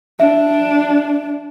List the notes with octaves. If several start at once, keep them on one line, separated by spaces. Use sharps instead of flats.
D4 E5